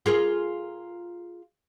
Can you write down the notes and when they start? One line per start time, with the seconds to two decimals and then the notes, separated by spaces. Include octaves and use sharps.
0.06 F4 G#4 A#4